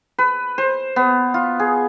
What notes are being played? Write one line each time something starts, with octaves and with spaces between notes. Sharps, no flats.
B4
C5
B3
F4
G#4